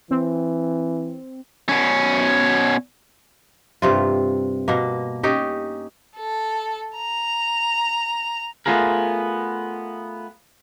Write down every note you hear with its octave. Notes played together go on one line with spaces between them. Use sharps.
E3 C4
B2 C#4
G2 C3 F4
B2 A#3
C#4 D#4 G4
A4
A#5
A3 B3 C4 F4 G#4 A#4